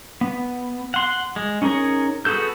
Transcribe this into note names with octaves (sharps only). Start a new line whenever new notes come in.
B3
F#5 C6
G#3
C#4 D#4 G#4 A#4 C#5
B3 F#4 G#4 A4 G6